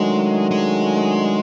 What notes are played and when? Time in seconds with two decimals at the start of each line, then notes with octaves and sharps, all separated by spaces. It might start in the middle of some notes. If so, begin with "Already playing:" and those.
Already playing: D#3 F#3 G#3 A3 D4
0.51 G#3